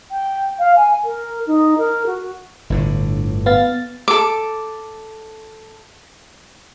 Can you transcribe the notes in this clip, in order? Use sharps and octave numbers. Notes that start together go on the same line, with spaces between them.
G5
F5
G#5
A#4
D#4
A#4
F#4
G1 A2 D3
B3 F5 A6
A4 D6